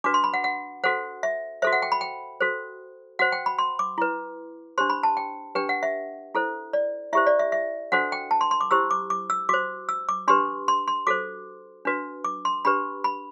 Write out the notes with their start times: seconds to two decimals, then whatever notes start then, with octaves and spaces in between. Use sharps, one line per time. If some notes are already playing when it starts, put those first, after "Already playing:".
0.04 D4 F#4 B4 D6
0.14 C6
0.24 B5
0.34 F#5
0.44 F#5
0.84 F#4 A4 C5 F#5
1.23 E5
1.62 F#4 A4 C5 E5
1.73 F#5
1.82 G5
1.92 B5
2.01 G5
2.41 F#4 A4 C5
3.19 F#4 C5 F#5
3.32 G5
3.46 B5
3.58 C6
3.79 D6
3.98 E4 B4
4.78 D4 G4 C5 C6
4.90 B5
5.03 A5
5.17 G5
5.55 D4 G4 B4 G5
5.69 F#5
5.83 E5
6.35 E4 A4 C5
6.73 D5
7.13 E4 G4 C5 E5
7.27 D5
7.39 E5
7.52 E5
7.92 D4 F#4 A4 C5 F#5
8.12 G5
8.31 A5
8.41 C6
8.51 C6
8.61 D6
8.71 E4 G4 C5 E6
8.91 D6
9.10 D6
9.30 E6
9.49 F#4 C5 D6
9.89 E6
10.09 D6
10.28 D4 G4 B4 C6
10.68 C6
10.88 C6
11.07 F#4 A4 C5 D6
11.85 D4 F#4 B4
12.24 D6
12.45 C6
12.65 D4 G4 B4 B5
13.04 B5